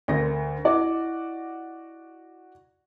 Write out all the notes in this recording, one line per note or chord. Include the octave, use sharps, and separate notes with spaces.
D2 D3 A#4 D5 A#6
E4 F#4 D5 D#5 D6